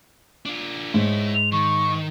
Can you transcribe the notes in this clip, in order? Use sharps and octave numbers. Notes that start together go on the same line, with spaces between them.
D4 F4
G#2 E4 C#5
F7
D#3 C#6